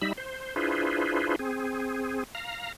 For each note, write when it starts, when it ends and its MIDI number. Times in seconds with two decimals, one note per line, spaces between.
0.02 0.13 55
0.02 0.13 63
0.02 0.13 76
0.02 0.13 83
0.18 0.55 72
0.56 1.36 62
0.56 1.36 64
0.56 1.36 65
0.56 1.36 68
0.56 1.36 71
0.56 1.36 72
1.39 2.24 60
1.39 2.24 68
2.35 2.72 77
2.35 2.72 82